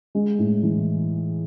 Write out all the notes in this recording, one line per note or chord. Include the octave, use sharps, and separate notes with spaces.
G#3
A2
E3